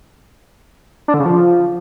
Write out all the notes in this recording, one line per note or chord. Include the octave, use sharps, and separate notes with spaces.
D4
D3
C#3
F3